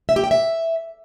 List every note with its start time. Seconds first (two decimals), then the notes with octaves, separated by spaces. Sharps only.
0.09 E5
0.16 G4
0.24 G5
0.31 E5